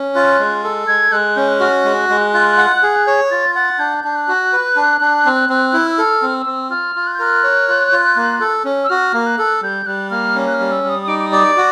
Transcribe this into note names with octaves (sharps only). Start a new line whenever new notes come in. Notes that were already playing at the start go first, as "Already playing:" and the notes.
Already playing: C#4
F4 F#6
G#3
A4
G#3 G#6
G#3 F#6
C#4 G6
F#6
F#4 F6
F#6
G#3
G#3
F4
F#5
G#4
C#5 G#6
F4 A6
F#5 A6
D4 G6
D4
F#6
F#4
B4
D4
D4
C4
C4
E4
E6
A4 F6
C4
E6
C4
F4 F6
F4
F#6
G6
A#4 F#6
C#5
F4
F4
A#3
A4
C#4
E6
F#4 F6
A#3
F#6
A4
G3 G6
G3 F#6
A#3 F6
C#4
F#6
F6
G3
E6
G3
D#6
D#6
D#4 D6
D6
D#6
D5
D6
F#4